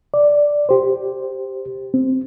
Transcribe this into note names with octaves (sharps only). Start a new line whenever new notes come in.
D5
G4 C5
C4